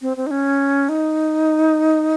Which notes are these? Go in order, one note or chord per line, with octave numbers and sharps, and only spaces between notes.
C4
C4
D#4
C#4
D#4